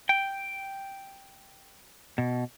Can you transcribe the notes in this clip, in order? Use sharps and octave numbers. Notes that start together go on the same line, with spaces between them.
G5
B2